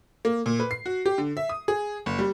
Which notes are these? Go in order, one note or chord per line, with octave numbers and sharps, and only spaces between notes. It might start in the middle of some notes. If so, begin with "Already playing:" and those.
A#3
A#2
B4
C7
F#4
G4
D3
E5
D#6
G#4
F#1
G3